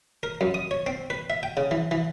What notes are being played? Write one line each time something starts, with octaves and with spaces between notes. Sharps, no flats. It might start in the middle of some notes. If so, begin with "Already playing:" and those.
A#4
F#2
D#6
C#5
C4
B4
E5
G5
C#3
E3
E3